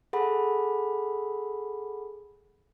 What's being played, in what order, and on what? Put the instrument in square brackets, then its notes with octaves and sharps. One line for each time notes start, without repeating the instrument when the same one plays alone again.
[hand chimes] G#4 A4 F#5 B5